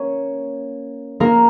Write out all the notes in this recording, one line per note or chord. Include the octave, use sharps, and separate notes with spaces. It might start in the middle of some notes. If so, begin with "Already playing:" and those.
Already playing: A#3 C#4 C#5
A#3 A#4